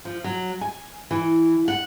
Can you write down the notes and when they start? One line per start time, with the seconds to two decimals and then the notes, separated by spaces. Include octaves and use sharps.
0.05 F3
0.24 F#3
0.61 G#5
1.11 E3
1.68 F#5